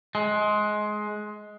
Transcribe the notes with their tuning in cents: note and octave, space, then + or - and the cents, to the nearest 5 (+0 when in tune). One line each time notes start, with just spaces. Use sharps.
G#3 +20